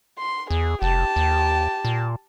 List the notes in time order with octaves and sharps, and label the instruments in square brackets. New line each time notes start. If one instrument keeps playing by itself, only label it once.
[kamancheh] C6
[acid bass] E2 [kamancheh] G#4
[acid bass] F1 [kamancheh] G4 A5
[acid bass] D#2
A#2